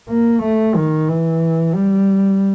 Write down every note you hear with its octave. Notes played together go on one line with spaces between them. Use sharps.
A#3
A3
D#3
E3
G3